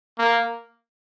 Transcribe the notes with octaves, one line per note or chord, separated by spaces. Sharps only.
A#3